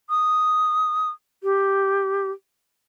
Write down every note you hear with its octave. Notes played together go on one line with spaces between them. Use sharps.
D#6
G4